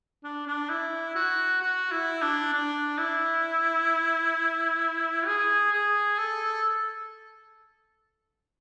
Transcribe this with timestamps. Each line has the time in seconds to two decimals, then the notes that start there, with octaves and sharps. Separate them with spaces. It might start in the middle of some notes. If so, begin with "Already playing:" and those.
0.24 D4
0.47 D4
0.70 E4
1.15 F#4
1.61 F#4
1.91 E4
2.22 D4
2.53 D4
2.98 E4
5.27 G#4
5.72 G#4
6.18 A4